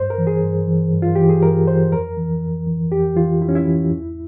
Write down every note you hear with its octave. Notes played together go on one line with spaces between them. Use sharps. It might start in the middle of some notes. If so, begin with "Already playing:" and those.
Already playing: G2 C5
A#4
E3
G#4
G2
E3
G2
F4
E3 G4
G#4
G2 A#4
E3 C5
F2 A#4
E3
F2
E3
F2 G4
E3 F4
F2 E4
C#4
E4
E3
E2